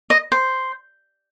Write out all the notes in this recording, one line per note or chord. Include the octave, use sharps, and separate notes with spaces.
D#5
C5